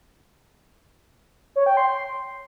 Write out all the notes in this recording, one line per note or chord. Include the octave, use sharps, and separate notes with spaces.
C#5
G5
C6
C6